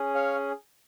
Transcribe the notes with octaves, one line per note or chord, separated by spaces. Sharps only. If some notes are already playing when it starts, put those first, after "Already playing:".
Already playing: C#4 G#4
C#5 F5